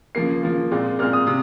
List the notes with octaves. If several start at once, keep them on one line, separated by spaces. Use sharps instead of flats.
C#3 F3 A#3 C7
C#3 F3 A#3
A#2 G#3 C4
A#2 G#3 C4 F6
D#6
C3